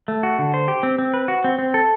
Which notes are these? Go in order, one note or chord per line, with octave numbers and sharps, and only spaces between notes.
A3
F#4
D3
C5
G4
C4
C4
B4
F#4
C4
C4
A4